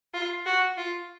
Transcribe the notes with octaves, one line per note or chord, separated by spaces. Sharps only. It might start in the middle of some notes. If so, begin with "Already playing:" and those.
F4
F#4
F4